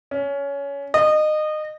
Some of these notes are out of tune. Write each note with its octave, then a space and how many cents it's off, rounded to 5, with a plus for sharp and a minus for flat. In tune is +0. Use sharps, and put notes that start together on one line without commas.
C#4 +20
D#5 -25